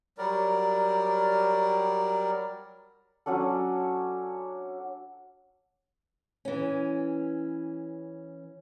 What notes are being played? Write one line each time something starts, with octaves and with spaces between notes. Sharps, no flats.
F#3 G3 A#4 D5
F#3 C#4 D4 A4
E3 C#4